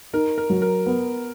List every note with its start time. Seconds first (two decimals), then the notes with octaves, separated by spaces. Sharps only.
0.13 D#4 A#4
0.38 A#4
0.50 F#3
0.62 A#4
0.86 B3